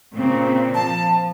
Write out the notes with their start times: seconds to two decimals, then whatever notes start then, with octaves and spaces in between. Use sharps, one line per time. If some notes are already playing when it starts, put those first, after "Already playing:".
0.13 A#2 C#3 C4
0.74 F3 A5